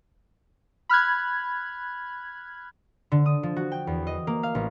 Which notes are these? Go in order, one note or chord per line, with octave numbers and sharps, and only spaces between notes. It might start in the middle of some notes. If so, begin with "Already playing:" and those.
B5 F6 F#6 G#6
D3
D#6
F3
F#4
G5
E2
D#5
A#3
F5
A1